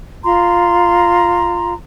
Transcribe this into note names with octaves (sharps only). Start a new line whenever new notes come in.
F4 A#5 C6